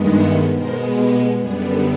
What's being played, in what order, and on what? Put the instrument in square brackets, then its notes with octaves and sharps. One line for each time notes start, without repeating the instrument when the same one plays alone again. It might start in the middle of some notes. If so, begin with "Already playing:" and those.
Already playing: [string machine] G2 D#3 G#3 B3
E5 F#5
B2 G#3 B3 A#4 C5
G4
F#2 D3 G3 B3 G#4